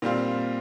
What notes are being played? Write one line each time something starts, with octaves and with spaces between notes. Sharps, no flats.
A#2 G3 C4 F4